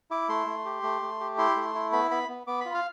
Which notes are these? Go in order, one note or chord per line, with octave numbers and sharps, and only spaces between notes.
E4 D6
A3 C6
A3
G4
A3
A3
G4
E4 C6
A3
E4
B3 B5
B3 B5
B3
B3 D6
F4 B5
F5